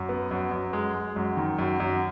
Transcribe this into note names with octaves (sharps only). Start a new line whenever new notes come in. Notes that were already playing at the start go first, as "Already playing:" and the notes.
Already playing: F#2
B3
F#2
F#2
G#3
G#3
F#2
D#3
F#2
F#2